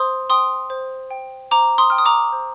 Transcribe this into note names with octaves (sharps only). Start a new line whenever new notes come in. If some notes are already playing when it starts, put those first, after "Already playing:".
Already playing: C5 C6 D#6
G5 C6 D#6
C5
G5
C5 A#5 D6
C6 D#6
G5 F6
D#6
A#5 D6
C5